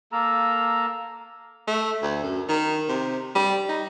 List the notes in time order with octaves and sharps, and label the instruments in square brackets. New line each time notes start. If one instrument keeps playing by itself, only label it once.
[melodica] A#3 A4 A#5
[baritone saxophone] A3
D2
F#2
D#3
C3
G3
D#4